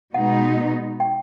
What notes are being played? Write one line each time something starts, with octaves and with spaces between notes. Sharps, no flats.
B2 G#3 B3 D#4 F#5
G5